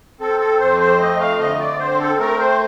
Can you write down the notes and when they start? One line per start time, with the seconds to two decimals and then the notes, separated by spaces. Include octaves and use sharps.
0.20 C4 A4
0.40 A4
0.59 F2 C5
0.80 C5
1.00 A3 D#5
1.20 F5
1.39 D3 D#5
1.60 D5
1.79 C4 C5
2.00 A4
2.19 A3 A#4
2.39 C5